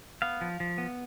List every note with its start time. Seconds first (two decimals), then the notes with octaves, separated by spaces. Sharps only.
0.22 B3 F5
0.41 F3
0.60 F3
0.78 B3